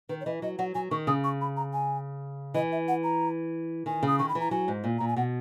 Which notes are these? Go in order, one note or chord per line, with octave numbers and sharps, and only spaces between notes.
D#3 B4
C#5
E3 D#5
F#3 D#5
F#3 F#5
F#3 G#5
D#3 C#6
C#3 D#6
C#6
B5
A#5
G#5
E3 D#5
E5
F#5
A#5
D#3 G#5
C#3 D#6
D#3 C#6
B5
E3
A#5
F#3 G#5
G#2
A#2
A#2 A#5
G#5
B2 F#5